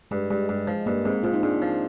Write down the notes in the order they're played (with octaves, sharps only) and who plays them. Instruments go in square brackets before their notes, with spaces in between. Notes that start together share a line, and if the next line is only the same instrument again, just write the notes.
[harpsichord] G2 [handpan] G#3
[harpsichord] G2 [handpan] G#3
[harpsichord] G2 [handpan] G#3
[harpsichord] F3 [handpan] G#3
[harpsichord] G2 [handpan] A#3
[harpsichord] G#2 [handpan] C4
[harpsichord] G#2 [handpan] F4
[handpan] D#4
[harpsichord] G#2 [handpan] D4
[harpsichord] F3